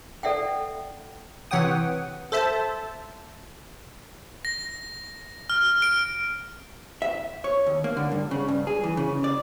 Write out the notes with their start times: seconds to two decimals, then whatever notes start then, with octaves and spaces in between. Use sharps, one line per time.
0.23 A4 D5 E5 F#5 G5
1.51 C3 E3 C#5 F#5 G5 D#6
2.32 A4 C5 E5 A5
4.45 A#6
5.50 F6
5.82 D7
7.02 E5
7.44 C#5
7.66 D#2
7.84 A#3
7.97 D3
8.12 G2
8.31 C#3
8.48 G2
8.67 G#4
8.84 E3
8.97 C#3
9.24 D5